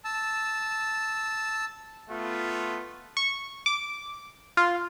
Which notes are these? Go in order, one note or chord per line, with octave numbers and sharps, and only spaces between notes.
A5 E6
A3 B3 F4
C#6
D6
F4